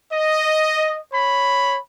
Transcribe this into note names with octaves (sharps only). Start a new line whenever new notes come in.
D#5
C#5 B5